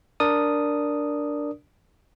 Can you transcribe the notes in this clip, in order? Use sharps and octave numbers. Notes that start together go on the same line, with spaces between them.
D4 A#4 D5 D#6